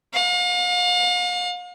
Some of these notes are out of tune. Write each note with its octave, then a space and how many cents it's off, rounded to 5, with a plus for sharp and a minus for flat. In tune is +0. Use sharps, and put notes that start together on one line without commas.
F5 +40